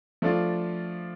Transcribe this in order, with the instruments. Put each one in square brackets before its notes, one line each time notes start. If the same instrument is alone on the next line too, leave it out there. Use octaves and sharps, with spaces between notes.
[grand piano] F3 A3 D4 F4